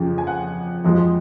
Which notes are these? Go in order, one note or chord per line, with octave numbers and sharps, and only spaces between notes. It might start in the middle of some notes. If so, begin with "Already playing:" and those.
Already playing: F2 C#3 F3
G#5
F#5
F2 F3 G#3